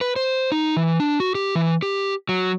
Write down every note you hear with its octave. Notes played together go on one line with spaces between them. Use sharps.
B4
C5
D#4
E3
D4
F#4
G4
E3
G4
F#3